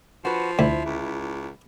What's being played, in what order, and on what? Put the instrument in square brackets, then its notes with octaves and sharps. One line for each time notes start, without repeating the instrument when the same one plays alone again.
[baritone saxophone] F3 [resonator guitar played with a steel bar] F#4 B4
[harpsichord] D2 [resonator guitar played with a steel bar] E4
[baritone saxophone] C#2